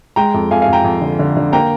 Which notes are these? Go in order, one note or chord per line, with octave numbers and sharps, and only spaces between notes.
G#3 G5 A#5
F2
F2 F5 G#5
F5 G#5
F2
G5 A#5
F2
D3
D3
D3
A#3 G5 A#5